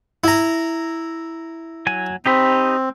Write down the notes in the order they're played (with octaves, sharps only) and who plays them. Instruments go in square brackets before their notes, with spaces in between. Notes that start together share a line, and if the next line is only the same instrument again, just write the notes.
[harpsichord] E4 A#5
[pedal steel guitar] F#3 G#5
[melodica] C4 [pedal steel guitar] D#4 G4 B5